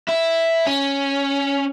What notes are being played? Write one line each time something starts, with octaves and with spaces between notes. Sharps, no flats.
E4
C#4